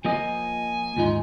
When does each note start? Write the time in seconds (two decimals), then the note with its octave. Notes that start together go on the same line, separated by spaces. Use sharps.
0.05 F3 A#3 D#5 G#5
0.97 D#2 G#2 D#4 F4